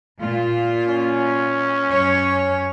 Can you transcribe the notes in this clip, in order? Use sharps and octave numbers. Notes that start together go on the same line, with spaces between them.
A#2 F4
C#4
F#2 C#5